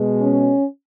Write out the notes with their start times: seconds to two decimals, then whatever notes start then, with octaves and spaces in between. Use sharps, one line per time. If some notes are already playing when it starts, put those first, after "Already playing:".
Already playing: B2 G#3
0.21 C#4